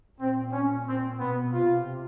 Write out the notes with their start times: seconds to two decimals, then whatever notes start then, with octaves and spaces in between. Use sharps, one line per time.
0.19 A#2 C4
0.52 C#4
0.86 C4
1.19 B2 B3
1.52 C3 F4